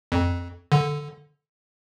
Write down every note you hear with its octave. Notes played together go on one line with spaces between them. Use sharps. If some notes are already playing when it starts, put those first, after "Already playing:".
F2
D3